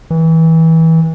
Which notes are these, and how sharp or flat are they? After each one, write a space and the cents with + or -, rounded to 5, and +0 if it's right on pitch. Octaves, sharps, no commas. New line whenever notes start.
E3 -25